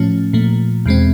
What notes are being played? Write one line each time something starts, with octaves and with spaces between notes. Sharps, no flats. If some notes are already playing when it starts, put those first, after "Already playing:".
Already playing: A2 F3 A3 C#4
A#2 F3 A3
E2 B2 G#3 C4